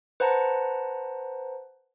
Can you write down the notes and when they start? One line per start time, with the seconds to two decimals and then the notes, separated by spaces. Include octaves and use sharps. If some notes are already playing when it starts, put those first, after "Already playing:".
0.20 B4 C5 F#5 A5 A#5